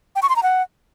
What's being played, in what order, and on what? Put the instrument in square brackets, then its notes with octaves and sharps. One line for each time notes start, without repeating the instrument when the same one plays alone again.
[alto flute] G5
C#6
C6
A#5
F#5